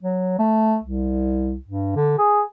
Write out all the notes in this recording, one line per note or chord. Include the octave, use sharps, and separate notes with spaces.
F#3
A3
C2
G2
D3
G#4